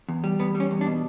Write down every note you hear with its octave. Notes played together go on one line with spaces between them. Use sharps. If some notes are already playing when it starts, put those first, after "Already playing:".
E2
G3
E2 B3
G3
C#4
E2
D4
B2